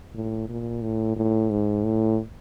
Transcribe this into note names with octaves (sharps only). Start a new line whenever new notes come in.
A2
A#2
A2
A2
G#2
A2